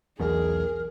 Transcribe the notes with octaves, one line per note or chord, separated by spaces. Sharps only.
B1 E2 B2 G#4 A#4